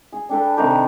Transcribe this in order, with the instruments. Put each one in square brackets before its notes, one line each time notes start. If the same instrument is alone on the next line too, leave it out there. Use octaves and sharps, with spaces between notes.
[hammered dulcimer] G#4
[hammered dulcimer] D4 A4 B4 [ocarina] G5
[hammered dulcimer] C3 D#3 G4 [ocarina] A#5